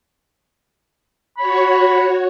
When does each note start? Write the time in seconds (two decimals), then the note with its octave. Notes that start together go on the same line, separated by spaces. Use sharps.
1.38 F#4 C#5 B5